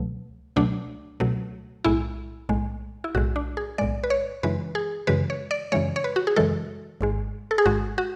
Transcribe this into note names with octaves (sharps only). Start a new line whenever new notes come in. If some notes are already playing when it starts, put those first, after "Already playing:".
Already playing: C#2 B2 F#3 A3
C#2 B2 F#3 A3 D4
C#2 B2 F#3 A3
B1 A2 G#3 E4
B1 A2 G#3
E4
B1 A2 G#3 F#4
D4
G#4
B1 A2 G#3 D5
B4
C#5
F#2 C#3 E3 G#3 B4
G#4
F#2 C#3 E3 G#3 B4
C#5
D5
F#2 C#3 E3 G#3 C#5
C#5
B4
F#4
G#4
F#2 C#3 E3 G#3 A4
G#1 G#2 G#3
A4
G#4
G#1 G#2 G#3 F#4
F#4